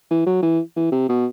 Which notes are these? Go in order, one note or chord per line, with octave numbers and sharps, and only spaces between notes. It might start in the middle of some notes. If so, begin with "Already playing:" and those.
E3
F#3
E3
E3
C3
B2